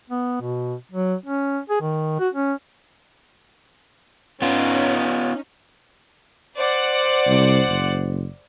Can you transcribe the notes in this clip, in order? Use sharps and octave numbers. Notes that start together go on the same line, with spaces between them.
B3
B2
F#3
C#4
G#4
D#3
F#4
C#4
B3 C#4 D#4 F4
C5 D5 F#5
C2
F#1